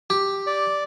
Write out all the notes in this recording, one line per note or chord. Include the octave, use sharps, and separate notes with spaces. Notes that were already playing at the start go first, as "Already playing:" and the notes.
G4
D5